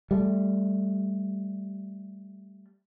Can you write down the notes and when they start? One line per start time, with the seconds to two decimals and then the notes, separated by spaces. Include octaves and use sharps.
0.11 G3 A3